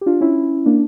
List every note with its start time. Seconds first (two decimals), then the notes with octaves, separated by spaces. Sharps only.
0.01 G4
0.06 D4 F4
0.21 C#4 E4
0.66 A#3 D4